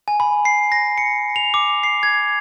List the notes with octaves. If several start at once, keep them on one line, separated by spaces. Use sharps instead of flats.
G#5
B5
C7
A#6
C#7
F7
D6
C7
G#6